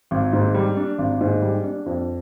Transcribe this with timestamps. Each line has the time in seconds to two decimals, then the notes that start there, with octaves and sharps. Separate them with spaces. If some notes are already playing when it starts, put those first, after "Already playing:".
0.11 G#1
0.33 G#2
0.54 G3
0.77 D4
0.98 G#1
1.21 G#2
1.42 G3
1.64 D4
1.86 F2